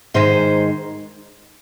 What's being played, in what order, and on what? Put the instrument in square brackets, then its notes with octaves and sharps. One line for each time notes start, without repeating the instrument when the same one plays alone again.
[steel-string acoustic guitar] G#2 D#3 G#3 C5